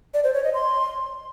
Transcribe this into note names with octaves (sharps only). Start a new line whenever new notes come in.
D5
C5
C#5
D#5
C6